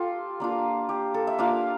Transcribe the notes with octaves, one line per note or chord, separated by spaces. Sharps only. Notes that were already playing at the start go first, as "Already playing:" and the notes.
Already playing: F4 G4 A4
A#3 D4 F4
G4
A4
E5
A#3 D4 F4 F5